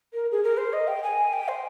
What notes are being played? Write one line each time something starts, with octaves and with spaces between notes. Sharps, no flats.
A#4
G#4
A#4
C5
D#5
G5
G#5
G5
C5